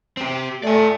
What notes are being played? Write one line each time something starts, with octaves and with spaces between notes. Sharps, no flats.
C4 G4
A3 D5 G#5